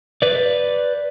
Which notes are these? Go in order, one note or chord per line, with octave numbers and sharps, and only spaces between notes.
B4 D5